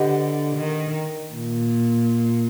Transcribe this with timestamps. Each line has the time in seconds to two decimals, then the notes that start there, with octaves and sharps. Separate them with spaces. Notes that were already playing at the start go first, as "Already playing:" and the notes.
Already playing: D3 G4 B4 D#5 F#5
0.55 D#3
1.33 A#2